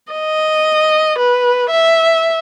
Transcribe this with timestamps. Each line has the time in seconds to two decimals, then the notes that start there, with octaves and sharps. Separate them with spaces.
0.12 D#5
1.18 B4
1.71 E5